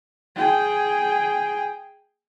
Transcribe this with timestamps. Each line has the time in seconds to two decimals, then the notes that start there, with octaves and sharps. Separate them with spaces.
0.36 G#4 G5